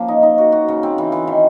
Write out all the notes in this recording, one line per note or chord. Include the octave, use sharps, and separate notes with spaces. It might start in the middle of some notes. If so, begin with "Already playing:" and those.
Already playing: F3 A#3 C#4
D#4
D#4
F#4
F#4
C#3
C4
E3
E3
D#3